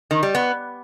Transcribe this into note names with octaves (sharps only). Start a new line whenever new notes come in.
D#3
G3
B3